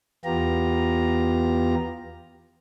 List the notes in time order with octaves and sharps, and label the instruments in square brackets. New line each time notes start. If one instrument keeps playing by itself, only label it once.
[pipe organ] E2 B3 F4 G4 A#5